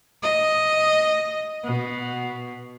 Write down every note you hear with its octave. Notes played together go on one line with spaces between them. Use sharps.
D#5
B2